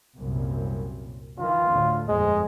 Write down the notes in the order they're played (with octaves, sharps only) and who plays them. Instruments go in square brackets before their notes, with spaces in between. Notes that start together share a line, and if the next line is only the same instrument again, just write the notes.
[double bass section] C2 F#2 A#2
[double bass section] D#3 E3 [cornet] F4
[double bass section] D2 A2 D3
[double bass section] G1 F2 A#2 [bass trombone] G#3 [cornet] D#5